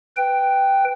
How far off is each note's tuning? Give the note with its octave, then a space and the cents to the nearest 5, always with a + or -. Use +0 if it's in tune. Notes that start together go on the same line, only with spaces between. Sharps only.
B4 +5 G5 +0